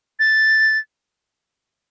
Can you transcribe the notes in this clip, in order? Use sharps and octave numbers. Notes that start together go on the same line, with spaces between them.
A6